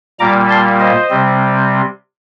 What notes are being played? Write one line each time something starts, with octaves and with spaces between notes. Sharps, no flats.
A#2 G3 A#3 A#5 D6
A5 C6
C5 D#5
C3 G3 C4